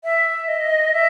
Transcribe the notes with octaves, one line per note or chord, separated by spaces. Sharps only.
E5
D#5
E5